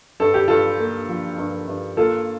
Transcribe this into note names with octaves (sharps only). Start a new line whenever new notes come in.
G2 A4
G4
G2 F4 A4
A#3
F3
G2
G2
A#3 F4 A4